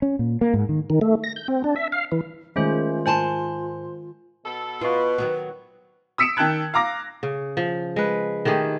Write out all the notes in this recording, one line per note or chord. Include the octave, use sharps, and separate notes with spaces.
C#4
A#2
A#3
G#2
D#3
D#3
A3
A#6
G6
C4
D4
E5
F5
E3
D#3 G#3 A3 C#4 F4 C5
G#2 C5 G#5 A5 C6
B2 A4
B2 F4 B4
D#3 F#3 B3
D#6 E6 B6 C#7 D7 E7
D#3 G5 A5 F#6 G#6
F5 A#5 D6 A#6
C#3
F3
G#3 B4
D#3 A3 G4 G#4